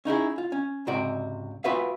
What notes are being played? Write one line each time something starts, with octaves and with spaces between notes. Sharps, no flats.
C#4 D#4 E4 G#4
F4
C#4
C#2 G#2 C3 F#4 D5
B3 F4 F#4 B4 E5 F5